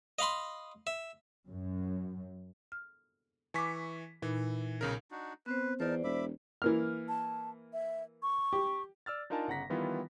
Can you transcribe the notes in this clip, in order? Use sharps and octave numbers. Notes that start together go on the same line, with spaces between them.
D#5 F5 B5 C6
E5
F#2
F6
E3 G#5 C#6 D6 B6
A#2 E3 D#4
B1 C#3 A#4
D4 D#4 F#4
B3 C4 B4 C5
E2 D#4 A#4 C5 D5 A5
E1 E5 B5 D6
E3 A#3 F6
A5
E5
C#6
G4
D5 E6 F6 A6
D4 D#4 F4 A#4 G#5 A5
G1 C#3 F#5 A#5 A#6 B6
D#3 E3 G3 B3 E4 F4